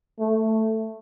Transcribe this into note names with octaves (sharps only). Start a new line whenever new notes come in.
A3